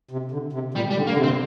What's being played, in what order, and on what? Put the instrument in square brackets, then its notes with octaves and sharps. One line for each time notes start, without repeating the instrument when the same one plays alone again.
[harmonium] C3
D3
C3
[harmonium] A#2 [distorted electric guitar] G3
[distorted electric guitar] G3
[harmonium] D3
[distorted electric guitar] A#3
[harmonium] D3
C3
[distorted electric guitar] C4